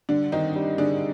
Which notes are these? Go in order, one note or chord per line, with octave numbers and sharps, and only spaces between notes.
D3 G3 D4
D#3 C4 D#4
G3
D3 D4 G#4